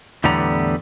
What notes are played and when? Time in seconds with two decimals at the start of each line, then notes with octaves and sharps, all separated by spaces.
0.24 E2 A2 D3 G3 B3 A#5